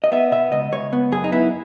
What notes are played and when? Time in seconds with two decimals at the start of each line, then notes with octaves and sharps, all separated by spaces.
0.04 D#5
0.12 B3 E5
0.32 B2 E5
0.52 C#2 D#5
0.72 C#2 C#5
0.93 B3
1.12 F#2 G#4
1.24 D#4
1.32 B3 E4